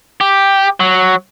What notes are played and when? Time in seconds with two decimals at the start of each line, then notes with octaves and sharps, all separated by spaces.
0.21 G4
0.80 F#3